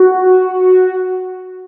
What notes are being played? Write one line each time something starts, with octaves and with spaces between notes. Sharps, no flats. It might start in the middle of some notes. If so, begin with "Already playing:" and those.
Already playing: F#4